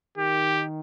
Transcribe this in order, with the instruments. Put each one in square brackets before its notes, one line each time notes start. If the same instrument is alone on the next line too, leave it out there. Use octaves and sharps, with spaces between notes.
[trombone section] D#3 [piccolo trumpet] G4